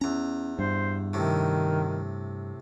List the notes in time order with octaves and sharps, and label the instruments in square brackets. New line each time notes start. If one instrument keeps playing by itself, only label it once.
[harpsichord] E2 A#5 [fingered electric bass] C#4
[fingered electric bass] G2 [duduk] C5
[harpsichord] A2 C3 [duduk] D#3